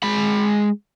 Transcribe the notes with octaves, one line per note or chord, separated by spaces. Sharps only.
G#3 B5